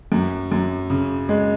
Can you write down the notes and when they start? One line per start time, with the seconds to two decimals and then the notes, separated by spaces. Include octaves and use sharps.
0.12 F#2
0.52 F#2
0.90 C#3
1.29 G#3